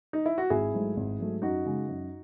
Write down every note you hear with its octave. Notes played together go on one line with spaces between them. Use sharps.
D#4
E4
F#4
G#1 E4 G#4
G#2 F#3 A3
G#1
G#2 F#3 A3
F#2 D#4 F#4
C#3 G#3
F#2